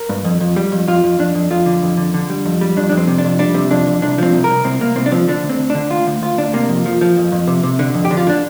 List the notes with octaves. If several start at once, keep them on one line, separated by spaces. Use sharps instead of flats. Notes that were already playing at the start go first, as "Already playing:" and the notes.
Already playing: A#4
G2
F2
F2
G3
F2
F2 F4
F2
F2 D4
F2
F2 F4
D3
F2
D3
D3
G3
F2
G3
F2 D4
D4
F2
C4
C3
D4
F2
G3 D4
C3
F2 D4
F2
C2 D4
F3 C4
C2
A#4
C2
C2 C4
C2 A#3
C2 C4
D4
F3 C4
D3 D4
D2
C4
D2
D3 D4
D2 F4
D2
D2 F4
D2 D4
C3 A#3
F2
F3
F3
F2
F2
C3
C3
D3
F2
G4
D3
F4
D3 D4